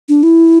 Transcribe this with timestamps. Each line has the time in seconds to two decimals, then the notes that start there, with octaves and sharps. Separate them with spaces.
0.09 D4
0.23 E4